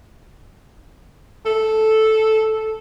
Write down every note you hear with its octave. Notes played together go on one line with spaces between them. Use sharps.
A4